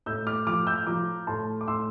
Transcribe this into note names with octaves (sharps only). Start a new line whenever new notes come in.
A2 E6 G6
D6 F6
F3 D6 F6
E6 G6
F3 A#5 D6
A2 A5 C6
D6
A2 C6 E6